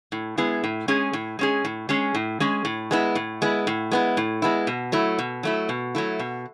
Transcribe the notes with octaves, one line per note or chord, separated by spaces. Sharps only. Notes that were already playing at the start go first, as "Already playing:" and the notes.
A2
G#3 B3 E4 G#4
A2
G#3 C#4 G#4
A2
G#3 C#4 G#4
A2
G#3 C#4 G#4
A2
G#3 C#4 G#4
A2
G#3 B3 E4
A2
G#3 B3 E4
A2
G#3 B3 E4
A2
G#3 B3 E4
B2
F#3 A3 E4
B2
F#3 A3 E4
B2
F#3 A3 E4
B2